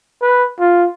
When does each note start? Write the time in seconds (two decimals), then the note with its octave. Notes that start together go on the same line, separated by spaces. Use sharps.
0.22 B4
0.60 F4